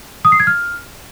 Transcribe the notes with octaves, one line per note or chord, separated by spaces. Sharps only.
D#6
C7
G#6
F6